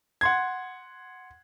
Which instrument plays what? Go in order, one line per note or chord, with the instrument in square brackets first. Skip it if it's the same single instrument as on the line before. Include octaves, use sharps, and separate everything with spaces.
[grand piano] F#5 C6 G#6